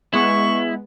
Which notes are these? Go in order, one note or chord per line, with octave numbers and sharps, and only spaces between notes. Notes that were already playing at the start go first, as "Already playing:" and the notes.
G#3 B3 E4 C#6